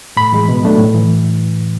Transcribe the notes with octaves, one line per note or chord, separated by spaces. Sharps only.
A2 B5
E3 G#3
B2
F#3 A3 D4
A2
E3